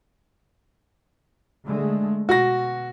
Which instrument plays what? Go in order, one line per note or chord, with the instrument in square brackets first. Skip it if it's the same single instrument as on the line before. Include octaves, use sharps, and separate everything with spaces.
[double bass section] D3 G#3 A3
[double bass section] B2 [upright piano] F#4 A#6